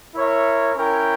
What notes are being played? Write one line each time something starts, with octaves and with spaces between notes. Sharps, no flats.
E4 A#4 C#5 E5
C#4 E4 A#4 C#5 G5